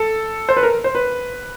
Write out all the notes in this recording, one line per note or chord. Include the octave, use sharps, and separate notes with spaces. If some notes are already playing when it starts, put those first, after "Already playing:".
Already playing: A4
C5
B4
A#4
C5
B4